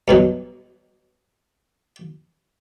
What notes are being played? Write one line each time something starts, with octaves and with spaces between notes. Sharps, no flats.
G2 B2 F#3